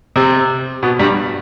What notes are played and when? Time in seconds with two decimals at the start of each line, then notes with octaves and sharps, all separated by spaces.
0.16 C3 C4
0.82 B2 B3
0.99 G2 G3